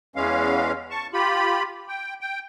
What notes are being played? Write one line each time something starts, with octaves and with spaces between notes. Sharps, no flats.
E2 E3 G#3 C#4 F5
A5 C#6
F4 G4 B5
G5
G5